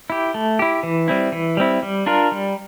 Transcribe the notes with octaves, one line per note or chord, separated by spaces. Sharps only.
E4 G4
A3
E4 G4
E3
G3 C4 E4
E3
G3 C4 E4
G3
D4 F4 A#4
G3